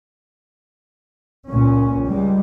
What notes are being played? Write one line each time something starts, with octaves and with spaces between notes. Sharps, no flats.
C#2 A#2 C#4
C#2 G3 G#3